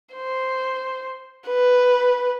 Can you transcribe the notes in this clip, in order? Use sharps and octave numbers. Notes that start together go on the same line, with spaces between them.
C5
B4